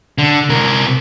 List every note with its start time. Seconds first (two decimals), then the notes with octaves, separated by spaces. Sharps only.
0.18 D3
0.49 C3 A#4